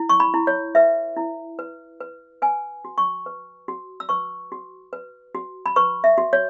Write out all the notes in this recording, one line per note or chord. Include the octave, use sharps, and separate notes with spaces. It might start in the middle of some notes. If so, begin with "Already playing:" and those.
Already playing: E4
C#6
B5
E4
C#5
B4 E5
E4
B4
B4
B4 G#5
F#4
C#6
B4
F#4
E6
B4 C#6
F#4
B4
F#4
B5
B4 C#6
E5
F#4
C#5